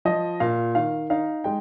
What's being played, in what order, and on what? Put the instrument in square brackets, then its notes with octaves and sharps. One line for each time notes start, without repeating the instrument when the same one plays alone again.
[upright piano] F3 D#5
A#2 F5
D#3 F5
D#4 F5
G#3 G5